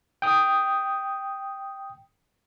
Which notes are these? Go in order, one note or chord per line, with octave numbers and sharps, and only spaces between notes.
G5 D#6